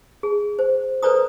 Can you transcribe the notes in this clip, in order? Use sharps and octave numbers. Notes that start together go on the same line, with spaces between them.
G#4
C5
A4 B4 C5 D5 A#5 D#6